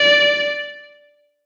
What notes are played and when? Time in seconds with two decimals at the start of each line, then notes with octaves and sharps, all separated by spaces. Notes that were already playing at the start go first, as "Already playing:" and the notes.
Already playing: D5